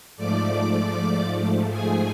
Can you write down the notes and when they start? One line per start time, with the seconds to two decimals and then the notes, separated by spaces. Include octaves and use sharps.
0.17 G#2 F3 A3 D5 D6
1.70 G#4 G#5